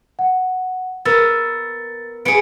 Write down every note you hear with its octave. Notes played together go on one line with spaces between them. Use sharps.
F#5
B3 A#4 E6 A6
B3 G#4 C#7 D7